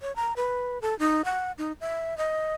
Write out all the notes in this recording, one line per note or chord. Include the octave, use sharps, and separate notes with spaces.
C#5
A#5
B4
A4
D#4
F#5
D#4
E5
D#5